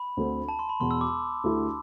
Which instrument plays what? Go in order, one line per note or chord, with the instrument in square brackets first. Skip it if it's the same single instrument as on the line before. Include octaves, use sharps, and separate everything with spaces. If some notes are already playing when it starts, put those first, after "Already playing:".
Already playing: [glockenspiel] B5
[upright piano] D2 D3 A3 C4
[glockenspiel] A5
C6
B5
[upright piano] E1 E2 B2 [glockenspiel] C6
[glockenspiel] E6
D6
[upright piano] D2 D3 A3 E4 G4